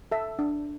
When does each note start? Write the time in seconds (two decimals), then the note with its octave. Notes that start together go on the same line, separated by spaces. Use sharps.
0.12 A4 E5
0.39 D4